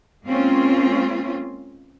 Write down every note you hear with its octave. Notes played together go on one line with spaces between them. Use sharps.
G#3 A#3 C4 C#4 F4